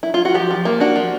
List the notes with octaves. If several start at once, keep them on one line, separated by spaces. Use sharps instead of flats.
E4
F4
F#4
F3 G4
F3
A#3
D4 F#4
F3